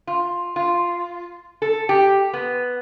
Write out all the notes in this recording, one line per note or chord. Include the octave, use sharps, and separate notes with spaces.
F4
F4
A4
G4
B3